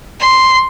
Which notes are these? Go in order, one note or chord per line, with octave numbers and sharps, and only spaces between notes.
C6